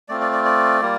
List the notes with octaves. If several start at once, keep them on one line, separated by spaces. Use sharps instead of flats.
A3 C4 F4 D5
D5
D5
D5
G3 A#3 F4